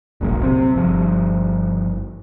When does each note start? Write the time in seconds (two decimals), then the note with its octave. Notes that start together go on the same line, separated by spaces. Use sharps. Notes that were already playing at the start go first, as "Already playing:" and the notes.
0.21 E1 B1 A#2 F#3
0.43 C3 C4
0.74 G1 F3